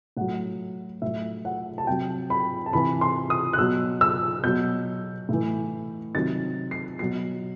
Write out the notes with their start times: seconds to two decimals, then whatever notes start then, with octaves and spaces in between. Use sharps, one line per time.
0.17 A2 F#3 F#5
1.02 A2 F#3 E5
1.45 F#5
1.78 A5
1.87 C3 F#3 G5
2.30 B5
2.66 A5
2.73 C3 E3 B5
3.01 C6
3.30 D#6
3.53 F#6
3.58 B2 F#3 E6
4.01 E6
4.43 B2 F#3 G6
5.29 A2 E3
6.15 C3 D#3 F#3 A6
6.71 C7
6.99 B2 F#3 C7